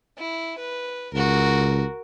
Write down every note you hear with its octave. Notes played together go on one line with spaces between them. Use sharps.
E4
B4
C#2 F#4 A#4